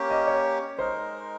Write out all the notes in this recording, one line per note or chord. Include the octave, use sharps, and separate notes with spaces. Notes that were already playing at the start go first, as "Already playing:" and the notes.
Already playing: A#3 C#4 G4
D#5
C#5
G#3 D#4 A#4 C5